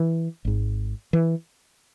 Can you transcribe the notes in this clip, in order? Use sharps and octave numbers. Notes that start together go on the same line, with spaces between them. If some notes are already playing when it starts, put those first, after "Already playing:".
Already playing: E3
G#1 G#2
E3